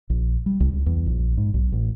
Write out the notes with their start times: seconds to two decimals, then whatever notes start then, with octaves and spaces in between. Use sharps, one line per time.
0.10 A#1
0.46 G3
0.60 C2
0.73 C#2
0.86 E2
1.06 A#1
1.37 G#2
1.54 B1
1.72 A1